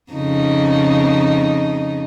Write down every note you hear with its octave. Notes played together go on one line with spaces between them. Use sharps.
F2 C#3 D#4